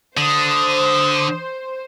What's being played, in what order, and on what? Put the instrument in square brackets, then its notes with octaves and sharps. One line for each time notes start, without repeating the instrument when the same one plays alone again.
[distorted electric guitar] D3 [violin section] C5 [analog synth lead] D#6